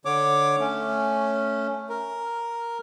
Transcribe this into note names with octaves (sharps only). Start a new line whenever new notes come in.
D3 C#5 D6
A3 C#4
A#4